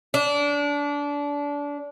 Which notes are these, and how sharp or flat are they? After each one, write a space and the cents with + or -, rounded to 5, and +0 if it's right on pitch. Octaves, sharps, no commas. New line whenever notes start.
D4 -25